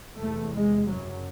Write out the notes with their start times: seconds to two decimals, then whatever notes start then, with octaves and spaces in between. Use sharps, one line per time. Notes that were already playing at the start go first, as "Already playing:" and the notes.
0.18 E2 C3 A3
0.54 G#3
0.88 F#2 C#3 F#3